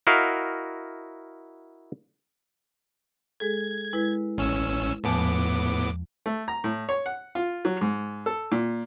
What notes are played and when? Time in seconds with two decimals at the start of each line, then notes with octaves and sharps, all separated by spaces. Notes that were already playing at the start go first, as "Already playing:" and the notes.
0.07 E4 F#4 A#4 D#5 F5
3.40 G#3 G#4 A4 G#6
3.93 G#3 E4 B4
4.38 A1 C#4 E6
5.04 E2 A2 F3 B3 A5 D6
6.26 A3
6.48 A#5
6.64 A2
6.89 C#5
7.06 F#5
7.35 F4
7.65 F#3
7.81 G#2
8.26 A4
8.52 A#2